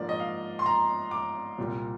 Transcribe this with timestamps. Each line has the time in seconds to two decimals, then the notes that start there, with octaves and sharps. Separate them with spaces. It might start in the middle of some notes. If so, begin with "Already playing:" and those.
Already playing: G#2 F3 A#3 D4 D5
0.09 D#5
0.20 F5
0.59 C6
0.66 A#5
1.11 D6
1.58 C2 A#2 G3 A#3